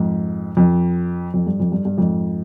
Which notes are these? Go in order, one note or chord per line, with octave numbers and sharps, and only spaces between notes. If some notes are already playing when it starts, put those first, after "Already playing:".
Already playing: F2 G#2
F2
F2
G2
F2
G2
G2
F2 G#2